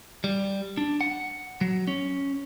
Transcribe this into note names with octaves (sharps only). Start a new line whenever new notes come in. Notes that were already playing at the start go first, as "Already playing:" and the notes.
G3
D4
F#5
F#3
C#4